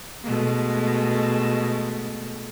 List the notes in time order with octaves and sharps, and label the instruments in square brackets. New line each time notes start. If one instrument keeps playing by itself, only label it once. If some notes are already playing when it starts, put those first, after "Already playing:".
[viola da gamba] B2 G#3 A3